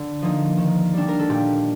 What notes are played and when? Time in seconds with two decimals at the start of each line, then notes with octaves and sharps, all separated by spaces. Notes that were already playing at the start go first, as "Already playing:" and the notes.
Already playing: D3
0.22 F3 A#3 D#4
0.58 D#3
0.94 G3 D4
1.08 A#4
1.19 A4
1.29 A#2 G4